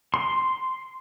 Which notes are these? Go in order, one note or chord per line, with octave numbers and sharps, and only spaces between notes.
C6